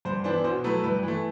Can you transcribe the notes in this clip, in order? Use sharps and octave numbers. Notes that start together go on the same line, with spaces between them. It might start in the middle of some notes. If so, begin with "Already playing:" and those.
G2 C5
E3 B3 D4 C5
B2 C5
F#3 A3 E4 B4
G2 B4
E3
A3